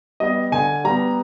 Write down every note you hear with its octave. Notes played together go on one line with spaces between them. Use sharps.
G3 B3 D#5
D3 G#5
G3 B3 A#5